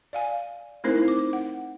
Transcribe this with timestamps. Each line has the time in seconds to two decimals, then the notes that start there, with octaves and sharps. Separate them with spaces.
0.13 D5 F5 G#5
0.84 A3 C4 D#4 E4 A#4 C5
1.08 D6
1.33 F#5